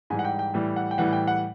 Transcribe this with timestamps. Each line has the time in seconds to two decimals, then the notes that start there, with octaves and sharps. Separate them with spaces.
0.10 G#2 E3 G3 G#5
0.19 F#5
0.25 G5
0.39 G5
0.54 A2 E3 G3
0.76 F#5
0.91 G5
0.98 A2 E3 G3 F#5
1.13 G5
1.27 F#5